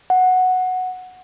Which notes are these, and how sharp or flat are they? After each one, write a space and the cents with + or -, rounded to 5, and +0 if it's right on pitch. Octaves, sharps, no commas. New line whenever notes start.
F#5 -5